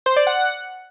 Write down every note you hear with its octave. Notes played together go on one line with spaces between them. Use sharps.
C5
D5
F#5